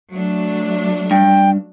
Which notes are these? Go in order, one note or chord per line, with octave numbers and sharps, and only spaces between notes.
F#3 A3 D4
G2 G5